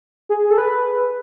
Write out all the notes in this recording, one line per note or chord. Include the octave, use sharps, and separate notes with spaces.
G#4
A4
B4